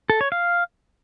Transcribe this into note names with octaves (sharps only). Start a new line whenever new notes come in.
A4
C#5
F5